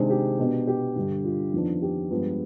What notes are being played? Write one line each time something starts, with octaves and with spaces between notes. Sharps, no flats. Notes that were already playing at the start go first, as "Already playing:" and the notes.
Already playing: C3 D#3 G#3 D4 C5
G4
B2 B3 D4
G4
G2 D3 G3
F4
F2 D#3 B3 D4
G4
G2 F3 G#3 B3